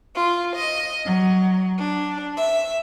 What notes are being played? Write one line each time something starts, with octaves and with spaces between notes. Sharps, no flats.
F4
D#5
F#3
D4
E5